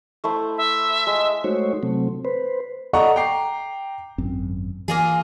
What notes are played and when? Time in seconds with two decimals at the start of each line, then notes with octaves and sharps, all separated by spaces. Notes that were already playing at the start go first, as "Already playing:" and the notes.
0.24 A3 E4 C5
0.57 E5
1.07 G#3
1.44 G#3 A3 D#4 F#4 C5 C#5
1.83 C3 F#3 A3 C4
2.25 B4 C5
2.93 A4 D5 D#5 F#5 A#5 C#6
3.16 G5 A#5 D6 C7
4.18 G#1 F#2 C4
4.88 E3 A#3 F4 G#4